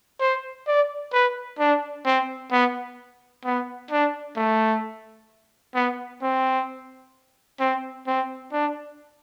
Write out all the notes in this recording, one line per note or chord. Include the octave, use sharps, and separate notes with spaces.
C5
D5
B4
D4
C4
B3
B3
D4
A3
B3
C4
C4
C4
D4